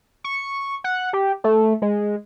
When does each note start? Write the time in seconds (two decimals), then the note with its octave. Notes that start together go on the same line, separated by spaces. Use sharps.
0.24 C#6
0.84 F#5
1.13 G4
1.44 A3
1.82 G#3